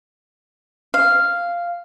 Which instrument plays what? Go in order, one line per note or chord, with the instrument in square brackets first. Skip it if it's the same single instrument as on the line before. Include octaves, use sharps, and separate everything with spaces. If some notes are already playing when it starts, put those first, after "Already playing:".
[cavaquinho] F5